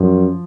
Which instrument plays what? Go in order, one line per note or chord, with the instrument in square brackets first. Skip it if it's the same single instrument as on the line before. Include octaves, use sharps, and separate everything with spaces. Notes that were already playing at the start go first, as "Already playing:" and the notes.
Already playing: [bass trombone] F#2 [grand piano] F3